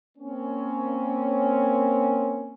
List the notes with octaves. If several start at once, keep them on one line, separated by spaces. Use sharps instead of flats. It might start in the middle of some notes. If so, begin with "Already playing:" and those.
A#3 C4 C#4